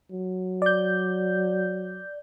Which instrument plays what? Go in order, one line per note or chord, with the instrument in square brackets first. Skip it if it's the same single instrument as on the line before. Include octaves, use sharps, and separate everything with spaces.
[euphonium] F#3
[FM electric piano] D5 G6